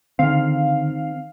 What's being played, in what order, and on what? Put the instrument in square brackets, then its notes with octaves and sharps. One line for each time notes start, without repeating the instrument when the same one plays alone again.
[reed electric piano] D3 [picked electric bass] D#3 C4 [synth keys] F5